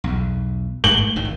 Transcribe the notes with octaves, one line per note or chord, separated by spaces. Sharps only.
B1 E2
G#2 A3 F#7 G7
G#1 A2 D#3